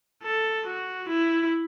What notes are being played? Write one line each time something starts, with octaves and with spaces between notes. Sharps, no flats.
A4
F#4
E4